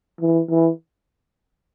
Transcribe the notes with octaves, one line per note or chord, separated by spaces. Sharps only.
E3
E3